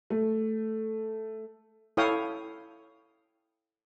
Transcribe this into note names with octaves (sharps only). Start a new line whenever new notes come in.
A3
E4 A4 C#5 F5 G5 D#6